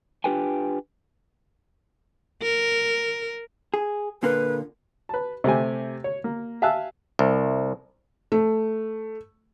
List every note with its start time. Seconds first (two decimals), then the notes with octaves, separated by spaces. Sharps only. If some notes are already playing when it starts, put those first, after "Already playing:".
0.24 D4 F4 G4 B4 G5 G#5
2.42 A#4
3.74 G#4
4.23 A#2 D3 A#3 B4
5.09 B4 A5
5.44 C3 A3 G4 G#5
6.04 C#5
6.24 A#3
6.62 E5 F5 G#5 A5 E6 F#6
7.19 C2
8.32 A3